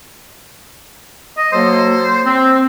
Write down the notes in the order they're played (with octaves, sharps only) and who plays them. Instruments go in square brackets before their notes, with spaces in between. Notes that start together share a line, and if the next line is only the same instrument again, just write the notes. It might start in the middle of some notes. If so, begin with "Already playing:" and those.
[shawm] D#5
[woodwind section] F#3 A#3 A4 [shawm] C5
[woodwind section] C4